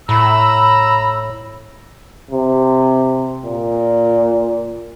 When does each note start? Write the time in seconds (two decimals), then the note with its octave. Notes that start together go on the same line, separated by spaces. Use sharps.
0.09 A2 A#5 B5 E6
2.31 C3
3.44 A#2